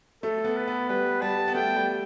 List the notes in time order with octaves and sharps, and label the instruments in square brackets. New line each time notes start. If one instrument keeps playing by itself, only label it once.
[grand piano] A3 [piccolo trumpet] A4
[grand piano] B3
[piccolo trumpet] B4
[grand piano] B3
[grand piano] G3 [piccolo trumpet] B4
[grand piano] G3 [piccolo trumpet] A5
[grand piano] B3
[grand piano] A3 [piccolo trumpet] G5
[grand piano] G3